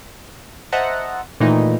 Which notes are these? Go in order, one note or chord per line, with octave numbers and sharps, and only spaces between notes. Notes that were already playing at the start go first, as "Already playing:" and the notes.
C5 D#5 E5 F#5 A5 A#5
A#2 D#3 E3 A3 D#4